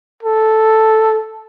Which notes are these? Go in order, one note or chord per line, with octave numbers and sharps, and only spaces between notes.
A4